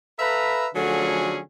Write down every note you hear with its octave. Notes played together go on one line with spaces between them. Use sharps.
A4 B4 E5 F5 A#5 B5
D3 F3 F#3 A3 C#4 G#4